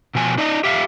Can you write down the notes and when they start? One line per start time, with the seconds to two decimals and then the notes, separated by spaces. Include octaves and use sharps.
0.15 B2 F3 G#5
0.38 D#4 D5 D#5 A5 A#5
0.64 G4 E5 F5